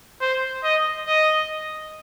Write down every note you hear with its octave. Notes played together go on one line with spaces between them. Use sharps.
C5
D#5
D#5